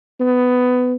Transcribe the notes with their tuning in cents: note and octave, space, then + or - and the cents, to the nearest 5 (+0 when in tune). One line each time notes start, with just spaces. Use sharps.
B3 +15